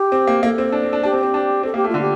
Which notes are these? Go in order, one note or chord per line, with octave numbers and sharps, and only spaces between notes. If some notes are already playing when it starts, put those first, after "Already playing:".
Already playing: G4
C4
A#3
A#3 A4
C4
D4
C4
D4
D4 G4
C4
C4
D4
C4 A4
A#3 G4
A3
F4
D3
G4